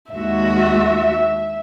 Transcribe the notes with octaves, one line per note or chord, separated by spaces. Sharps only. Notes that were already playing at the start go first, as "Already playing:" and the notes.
D#2 G#3 F#4 E5